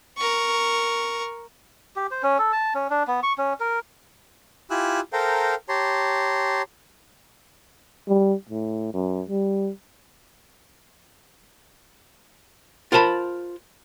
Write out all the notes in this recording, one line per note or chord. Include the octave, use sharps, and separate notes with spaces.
A#4 C#6
G4
C5
C#4
A4
A5
C#4
D4
B3
C#6
C#4
A#4
E4 F4 G4 G#5 E6 F#6
A4 A#4 C5 F5 G5 A#5
G4 C#5 A5 A#5 C6
G3
A2
F#2
G3
F4 A#4 C5 A5 B5